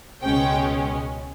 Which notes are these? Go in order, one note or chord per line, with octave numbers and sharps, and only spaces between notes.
C#2 B2 G#3 C#4 G5